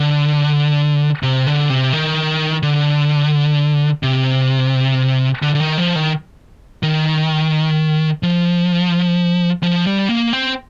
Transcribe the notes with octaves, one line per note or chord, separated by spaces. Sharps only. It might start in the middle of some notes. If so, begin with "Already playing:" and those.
Already playing: D3
C3
D3
C3
D#3
D3
C3
D3
D3
D#3
F3
D#3
D#3
F3
F3
G3
A#3
C4